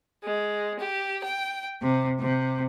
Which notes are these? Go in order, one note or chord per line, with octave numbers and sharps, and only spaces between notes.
G#3
G4
G5
C3
C3